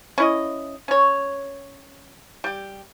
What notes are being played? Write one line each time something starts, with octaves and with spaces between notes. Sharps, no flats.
C#4 E4 D#5
C#4 C#5
G3 G4